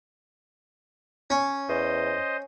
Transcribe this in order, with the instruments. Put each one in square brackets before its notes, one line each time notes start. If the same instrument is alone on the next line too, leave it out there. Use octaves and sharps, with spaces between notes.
[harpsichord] C#4
[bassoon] E2 [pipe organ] C5 D#5